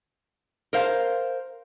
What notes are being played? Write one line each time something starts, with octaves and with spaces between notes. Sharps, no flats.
A#4 C5 F5